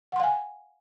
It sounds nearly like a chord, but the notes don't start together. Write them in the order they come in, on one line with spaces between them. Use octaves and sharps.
F#5 C6 F5 G#5